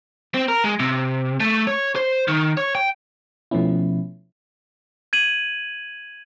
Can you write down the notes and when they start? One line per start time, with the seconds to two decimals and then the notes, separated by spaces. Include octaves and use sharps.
0.34 C4
0.48 A#4
0.64 G#3
0.80 C3
1.40 A3
1.67 C#5
1.95 C5
2.28 D#3
2.57 C#5
2.75 G5
3.51 B2 F3 A3 B3 C#4 E4
5.13 G#6 D#7 F#7